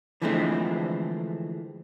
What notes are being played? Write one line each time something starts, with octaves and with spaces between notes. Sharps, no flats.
D3 E3 F3 G#3 A3 C4